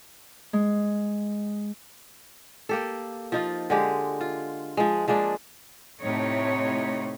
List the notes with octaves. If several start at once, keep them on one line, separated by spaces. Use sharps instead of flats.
G#3
A#3 G4 A4
F3 D#4 F4
D3 G#3 G4
F4
F3 G#3
F3 G#3 A#3 D4
A2 C3 A3 D#4 C#5